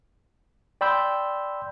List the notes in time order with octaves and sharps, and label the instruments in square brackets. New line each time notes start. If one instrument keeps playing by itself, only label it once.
[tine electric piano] D5 G5 B5 C6 E6 G6